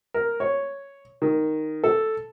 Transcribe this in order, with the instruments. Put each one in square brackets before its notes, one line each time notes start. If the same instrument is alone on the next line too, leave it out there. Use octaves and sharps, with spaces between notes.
[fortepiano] A#4
C#5
D#3
A4